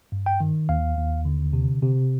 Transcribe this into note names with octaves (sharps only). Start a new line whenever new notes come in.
G2
G5
D#3
D#2 F5
D#2
D3
C3
C3